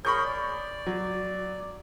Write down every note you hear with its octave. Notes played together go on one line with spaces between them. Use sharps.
G#4 A#4 C#5 B5 C#6 G6
D5
F#3